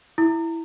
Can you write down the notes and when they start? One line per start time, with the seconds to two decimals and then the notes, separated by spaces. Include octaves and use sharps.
0.18 E4